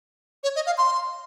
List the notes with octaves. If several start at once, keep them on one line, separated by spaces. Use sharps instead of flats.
C#5
D#5
F5
C6